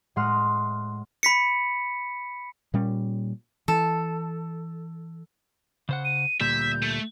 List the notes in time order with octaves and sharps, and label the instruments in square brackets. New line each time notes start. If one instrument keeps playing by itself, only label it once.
[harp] A2 G#3 F#5 C6 D#6 F6
[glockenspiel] B5 B6 C#7
[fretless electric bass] A#2 G3 C#4
[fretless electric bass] E3 [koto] A4
[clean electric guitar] C#3 C5 F#5
[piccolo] D#7
[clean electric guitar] D2 A#2 G3 [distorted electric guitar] E5 [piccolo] G6
[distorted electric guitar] A3